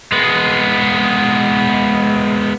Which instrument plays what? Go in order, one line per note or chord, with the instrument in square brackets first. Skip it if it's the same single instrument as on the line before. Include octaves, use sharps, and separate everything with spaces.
[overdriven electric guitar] G#3 B3